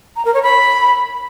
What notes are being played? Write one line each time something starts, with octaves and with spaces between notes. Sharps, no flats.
A#5
A#4
C#5
B5